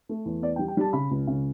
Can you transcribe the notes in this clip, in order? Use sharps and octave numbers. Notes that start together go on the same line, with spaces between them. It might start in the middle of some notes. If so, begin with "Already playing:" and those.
A3
E2
B3 D5
G5
G3
G5
G3 A5
C#3 B5
C#2
C#3